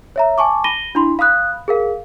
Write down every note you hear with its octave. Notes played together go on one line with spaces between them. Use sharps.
C#5 E5 A#5
G#5 A5 C#6 D6
B5 A#6 D#7 G7
D4 E4 B5 C6
F5 B5 D#6 F#6
G#4 A#4 F5